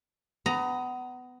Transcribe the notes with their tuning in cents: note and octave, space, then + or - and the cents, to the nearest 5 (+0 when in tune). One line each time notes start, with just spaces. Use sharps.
B3 +25 A#5 +0